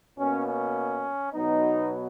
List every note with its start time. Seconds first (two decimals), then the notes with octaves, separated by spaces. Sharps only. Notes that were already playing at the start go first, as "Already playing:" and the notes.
0.17 B2 A#3 C#4
0.46 C#4
1.32 B2 F#3 B3 D#4